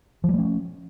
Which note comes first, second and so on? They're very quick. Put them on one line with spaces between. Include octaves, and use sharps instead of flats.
F3 G3 A3 C#4